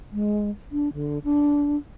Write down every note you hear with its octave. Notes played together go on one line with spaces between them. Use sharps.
G#3
D4
D3
D4